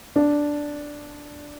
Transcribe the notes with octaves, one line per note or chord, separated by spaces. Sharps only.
D4